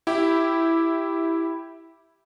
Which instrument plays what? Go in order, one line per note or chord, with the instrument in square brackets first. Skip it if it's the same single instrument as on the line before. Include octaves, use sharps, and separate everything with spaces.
[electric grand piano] E4 G4